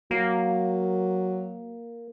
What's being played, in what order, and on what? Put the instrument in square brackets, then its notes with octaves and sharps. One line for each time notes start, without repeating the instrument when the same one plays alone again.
[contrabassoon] F#3 [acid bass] A#3